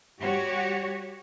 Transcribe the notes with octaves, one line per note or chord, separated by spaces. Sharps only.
G3 F#4 G4 C#5